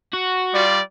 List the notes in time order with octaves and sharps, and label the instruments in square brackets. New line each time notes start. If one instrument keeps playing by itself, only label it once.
[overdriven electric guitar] F#4
[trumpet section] G3 F4 D5